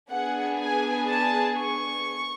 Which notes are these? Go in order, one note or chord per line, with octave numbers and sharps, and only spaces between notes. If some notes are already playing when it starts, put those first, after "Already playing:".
B3 D4 G#4 F#5
G#5
A5
C#6